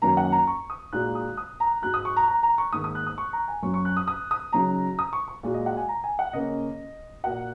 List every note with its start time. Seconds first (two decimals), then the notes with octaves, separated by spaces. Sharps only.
0.02 F#2 D#3 A#3 C#4 F#4 A#5
0.17 F#5
0.32 A#5
0.47 C#6
0.70 D#6
0.93 A#2 G#3 D#4 F#4 F#6
1.15 D#6
1.37 D#6
1.60 A#5
1.82 G#2 G#3 F#4 F#6
1.94 D#6
2.05 C#6
2.17 A#5
2.28 A#5
2.43 A#5
2.58 C#6
2.73 G#2 D#3 A#3 D#6
2.84 D#6
2.95 F#6
3.07 D#6
3.18 C#6
3.33 A#5
3.48 G#5
3.63 F#2 F#3 C#4 F#4 C#6
3.74 C#6
3.85 F#6
3.97 D#6
4.08 D#6
4.31 D#6
4.53 C#3 F#3 D#4 A#5
4.99 D#6
5.13 C#6
5.28 C#6
5.43 A#2 G#3 F#4
5.54 D#5
5.66 F#5
5.77 G#5
5.89 A#5
6.04 G#5
6.19 F#5
6.33 C#3 A#3 C#4 D#5
7.24 A#2 A#3 F#4 F#5